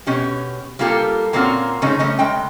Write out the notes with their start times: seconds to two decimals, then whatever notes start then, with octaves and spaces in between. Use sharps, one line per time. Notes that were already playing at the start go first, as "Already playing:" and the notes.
0.07 B2 C#4 G4
0.79 G3 A#3 F4 G4 A4
1.33 A#2 A#3 C4 C#4 F4 F#4
1.82 G#2 C#3 A3 C#4 D#4
1.99 G3 A3 C#4 D#5
2.19 C#3 G#3 G5